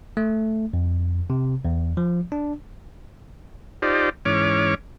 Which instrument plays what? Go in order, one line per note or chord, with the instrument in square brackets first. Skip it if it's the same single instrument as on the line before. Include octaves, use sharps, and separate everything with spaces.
[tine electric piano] A3
F2
C3
E2
F3
D4
[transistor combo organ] D#4 F4 G4 C5 D5
G#2 E3 C#4 C#5 D6 F6